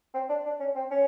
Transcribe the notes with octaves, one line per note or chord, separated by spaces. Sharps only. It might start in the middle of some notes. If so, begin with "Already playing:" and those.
C4
D4
D4
C#4
C4
C#4